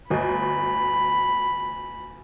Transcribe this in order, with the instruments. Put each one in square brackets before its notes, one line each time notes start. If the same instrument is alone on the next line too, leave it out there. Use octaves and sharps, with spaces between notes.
[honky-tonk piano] G1 D2 D#5 [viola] B5